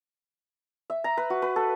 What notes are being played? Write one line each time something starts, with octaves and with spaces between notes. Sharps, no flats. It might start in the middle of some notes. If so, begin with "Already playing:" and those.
E5
A#5
B4
F#4
B4
A4